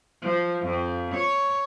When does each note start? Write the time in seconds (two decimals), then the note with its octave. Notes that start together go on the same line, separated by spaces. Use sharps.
0.22 F3
0.65 F2
1.13 C#5